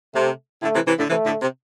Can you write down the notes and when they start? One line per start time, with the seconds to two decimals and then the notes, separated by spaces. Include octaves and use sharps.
0.15 C3 A3
0.62 A2 D3 A3
0.74 C3 E3
0.86 C3 E3
0.98 A2 D3
1.10 C3 E3 A3
1.25 A2 D3
1.41 C3